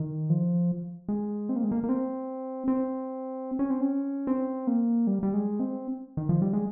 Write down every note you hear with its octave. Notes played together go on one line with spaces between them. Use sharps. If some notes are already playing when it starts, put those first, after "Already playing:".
Already playing: D#3
F3
G#3
C4
A#3
G#3
A#3
A#3
C4
C4
C#4
C4
C#4
C4
A#3
G3
G3
G#3
C4
D#3
F3
G3
G#3